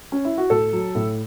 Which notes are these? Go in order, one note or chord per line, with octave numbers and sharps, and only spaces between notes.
C#4
E4
F#4
A2 A4
F#3
A2